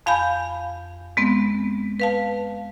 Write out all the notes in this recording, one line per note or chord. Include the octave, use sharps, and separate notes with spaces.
F2 F5 G#5 B5 G6
G#3 B3 C4
B4 F5 A5